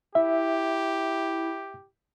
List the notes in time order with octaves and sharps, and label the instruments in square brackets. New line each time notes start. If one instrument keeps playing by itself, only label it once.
[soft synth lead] E4 [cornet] G4 [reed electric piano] E5